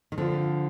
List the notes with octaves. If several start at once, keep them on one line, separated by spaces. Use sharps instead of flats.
D#3
D3 F3 C4 F4